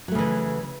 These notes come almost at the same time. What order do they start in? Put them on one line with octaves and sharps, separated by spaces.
F#3 A3 C#3 E3